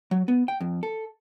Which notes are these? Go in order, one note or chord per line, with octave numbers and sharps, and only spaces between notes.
F#3
B3
G5
F2
A4